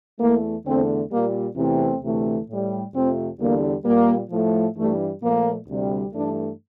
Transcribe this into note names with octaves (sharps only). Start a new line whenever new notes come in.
E2 E3 A3 A#3
E2 D3 A3 C4
A#2 G3 A#3
E2 C3 E3 A3 C4
D2 C3 E3 A3
A2 G3
F2 C3 F3 A3 C4
E2 D3 G3 A#3
A#2 G3 A#3
A2 F3 A3
G2 E3 G3 A3
A#2 F3 A3 A#3
D2 C3 G3
G2 E3 A3 D4